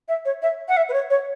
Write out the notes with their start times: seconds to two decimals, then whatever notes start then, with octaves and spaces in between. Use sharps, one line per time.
0.08 E5
0.25 C#5
0.42 E5
0.68 F#5
0.77 E5
0.89 B4
0.93 C#5
1.10 C#5